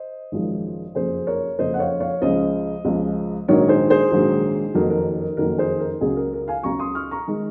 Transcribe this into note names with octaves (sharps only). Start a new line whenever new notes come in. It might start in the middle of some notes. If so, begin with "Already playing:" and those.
Already playing: C5 D#5
G#1 F#2 F3 G#3
F#1 F2 C#3 F3 G#4 C5
A#4 C#5
F#1 F2 C#3 F3 C5 D#5
F#5
C#5 F5
C#5 F5
C#2 C#3 F3 G#3 C5 D#5
C#2 C#3 F3 G#3
A#1 G#2 D#3 F#3 A#4 C#5
G#4 C5
G#4 C5
A#1 G#2 D#3 F#3
F#1 F2 D#3 F#3 A#4
A#4
A#4
F#1 F2 D#3 F#3 A#4
G#4 C5
A#4
C#2 C#3 F#3 G#4
A#4
A#4
F5 G#5
C#2 C#3 F#3 A#5 C#6
C6 D#6
C#6 F6
A#5 C#6
D#3 G#3